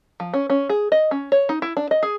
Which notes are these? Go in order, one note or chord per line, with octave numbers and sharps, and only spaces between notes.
F3
C#4
C#4
G#4
D#5
C#4
C#5
D#4
E4
D4
D#5
G#4